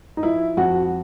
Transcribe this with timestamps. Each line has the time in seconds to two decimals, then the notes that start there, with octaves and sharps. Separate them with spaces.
0.17 D#4
0.23 F3 E4
0.57 F2 F#4